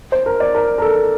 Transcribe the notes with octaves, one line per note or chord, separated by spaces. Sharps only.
C5
A#4
D5
A#4
A#4
A4